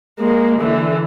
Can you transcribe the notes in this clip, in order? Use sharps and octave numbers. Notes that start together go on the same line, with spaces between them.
G#3 A#3
D3 E3